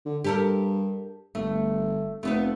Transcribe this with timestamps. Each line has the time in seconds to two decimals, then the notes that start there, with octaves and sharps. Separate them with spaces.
0.05 D3
0.24 G2 G4 A4 A#4
1.35 G1 A3
2.23 F1 A3 B3 B4